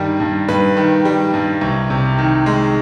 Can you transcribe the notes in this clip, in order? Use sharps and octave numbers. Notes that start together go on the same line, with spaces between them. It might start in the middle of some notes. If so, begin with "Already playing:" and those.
Already playing: G2 D#3 G3
G2
G2 B4
D#3
G3
G2
C2
C3
D#3
G#3